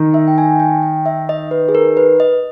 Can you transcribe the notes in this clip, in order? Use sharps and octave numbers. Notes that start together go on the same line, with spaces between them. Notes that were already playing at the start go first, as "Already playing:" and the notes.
Already playing: D#3 D#4
E5
G5
G#5
G5
G5
E5
D#5
B4
G#4
A#4
B4
D#5